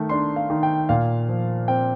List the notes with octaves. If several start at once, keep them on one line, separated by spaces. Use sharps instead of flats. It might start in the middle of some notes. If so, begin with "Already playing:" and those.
Already playing: D#3 A3
D4 C6
F5
D#3
G5
A#2 F5
F3
C4 G5